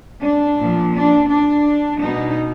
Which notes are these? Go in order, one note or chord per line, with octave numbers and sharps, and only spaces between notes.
D4
A#2 F3
D4
D4
B2 D#4